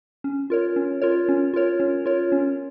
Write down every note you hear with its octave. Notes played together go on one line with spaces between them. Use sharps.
C#4
F4 A#4 C#5
C#4
F4 A#4 C#5
C#4
F4 A#4 C#5
C#4
F4 A#4 C#5
C#4